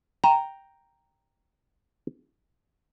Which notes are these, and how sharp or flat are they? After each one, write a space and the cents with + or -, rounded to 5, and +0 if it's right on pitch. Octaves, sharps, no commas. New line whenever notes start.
G5 +0 A#5 +0